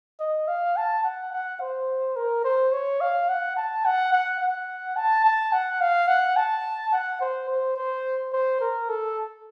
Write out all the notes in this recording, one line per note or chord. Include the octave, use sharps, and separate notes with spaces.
D#5
F5
A5
F#5
F#5
C5
A#4
C5
C#5
F5
F#5
A5
F#5
F#5
F#5
A5
A5
F#5
F5
F#5
A5
F#5
C5
C5
C5
C5
A#4
A4